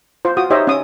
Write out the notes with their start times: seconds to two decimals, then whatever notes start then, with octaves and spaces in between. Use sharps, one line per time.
0.25 F4 C5
0.37 F4 F#4 D#6
0.50 D#4 G4 C5 C#5 D#5 E5
0.67 C#4 D#6